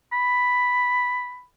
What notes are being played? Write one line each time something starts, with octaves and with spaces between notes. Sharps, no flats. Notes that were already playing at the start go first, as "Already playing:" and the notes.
B5